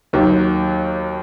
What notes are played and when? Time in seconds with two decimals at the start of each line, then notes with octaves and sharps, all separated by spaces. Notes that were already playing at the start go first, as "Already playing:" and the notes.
0.13 D#2 D#3 F#3